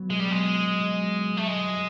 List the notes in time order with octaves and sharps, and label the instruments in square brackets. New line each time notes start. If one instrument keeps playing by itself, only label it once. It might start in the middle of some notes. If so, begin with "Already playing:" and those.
Already playing: [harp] F#3 B3
[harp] B2 [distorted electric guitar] G#3
[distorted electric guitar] G3
[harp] F#3 [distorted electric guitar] G#3
[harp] B3
B2
B2
F#3
B3
B2
[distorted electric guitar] A3
[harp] G1 [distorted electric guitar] G#3
[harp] F#2